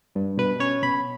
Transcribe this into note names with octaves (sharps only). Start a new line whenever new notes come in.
G2
B2 B4
C#4 C#5
B2 B5